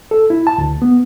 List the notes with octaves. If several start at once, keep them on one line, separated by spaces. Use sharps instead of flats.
A4
E4
A5
D2
B3